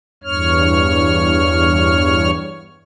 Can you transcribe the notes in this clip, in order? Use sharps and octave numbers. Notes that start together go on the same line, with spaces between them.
E2 G2 C#5 F6